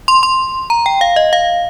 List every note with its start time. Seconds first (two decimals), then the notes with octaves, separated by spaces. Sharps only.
0.08 C6
0.23 C6
0.70 A#5
0.86 G5
1.01 F5
1.16 D#5
1.33 F5